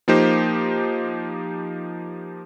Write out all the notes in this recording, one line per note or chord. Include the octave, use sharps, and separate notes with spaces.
F3 A#3 D#4 G4 C5